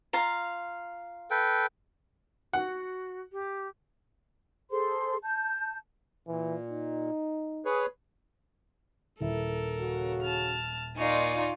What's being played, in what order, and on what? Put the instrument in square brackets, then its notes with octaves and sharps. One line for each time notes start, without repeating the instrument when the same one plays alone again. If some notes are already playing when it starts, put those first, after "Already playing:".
[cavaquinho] F4 F5 A#5
[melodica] A4 B4 G5
[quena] F#4 [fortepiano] F#5
[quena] G4
[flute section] G#4 A4 C5 C6
A5 G6
[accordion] A#2 [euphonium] E3
[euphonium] D#4
[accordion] G#4 B4 C#5
[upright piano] D#1 E4 [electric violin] A4 A#4
[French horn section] C#3 F#4
[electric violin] A5 F6
[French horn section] A#2 [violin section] D#4 F4 D5 [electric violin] G#5 C#6